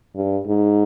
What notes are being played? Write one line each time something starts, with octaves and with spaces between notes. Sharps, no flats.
G2
G#2